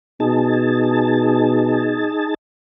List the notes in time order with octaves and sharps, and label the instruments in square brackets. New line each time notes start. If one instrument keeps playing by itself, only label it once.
[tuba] B2 [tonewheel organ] D#4 G#4 A5